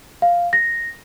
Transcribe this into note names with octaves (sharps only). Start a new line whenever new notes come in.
F5
A#6